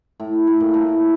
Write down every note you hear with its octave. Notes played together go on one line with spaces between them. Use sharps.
A2
A2
A#2
A2